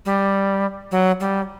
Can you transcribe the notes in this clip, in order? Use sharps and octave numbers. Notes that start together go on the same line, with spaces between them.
G3
F#3
G3